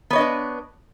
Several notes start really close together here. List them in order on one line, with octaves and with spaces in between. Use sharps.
B3 C#5 D#5 D4 B4